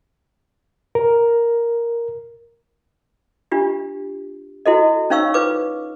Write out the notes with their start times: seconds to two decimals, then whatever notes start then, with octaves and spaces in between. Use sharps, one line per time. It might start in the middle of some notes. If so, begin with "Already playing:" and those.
0.95 A#4
3.51 D4 F4 G4
4.66 E4 F#4 A4 D#5
5.10 C#4 D#4 C#5 F5 C#6 E6
5.34 F4 B4 D6